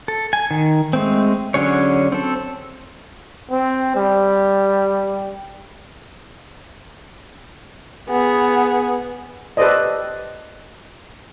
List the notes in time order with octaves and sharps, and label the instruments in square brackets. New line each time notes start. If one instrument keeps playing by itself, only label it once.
[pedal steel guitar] A4
G#5
D#3
G#3 A3 C4
D3 F#3 C#4 G#4 C#5
C4 A4
[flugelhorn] C4
G3
[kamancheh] B3 G#4
[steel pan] G4 A4 B4 C5 D5 D#5